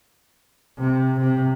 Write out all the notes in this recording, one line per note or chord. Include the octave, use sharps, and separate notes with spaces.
C3
C3